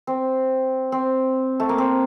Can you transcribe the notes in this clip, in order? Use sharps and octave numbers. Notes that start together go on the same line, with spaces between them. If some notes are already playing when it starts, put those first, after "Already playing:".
C4
C4
A3
A#3
C4